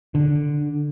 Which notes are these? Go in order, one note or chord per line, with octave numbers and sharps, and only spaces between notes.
D3